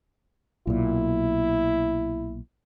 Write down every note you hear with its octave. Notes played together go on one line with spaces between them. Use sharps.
B1 A#2 E4